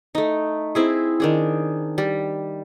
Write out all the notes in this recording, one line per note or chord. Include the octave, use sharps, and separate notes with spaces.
A3 D#4
C4 E4 G#4
D#3 D4 G#4
G3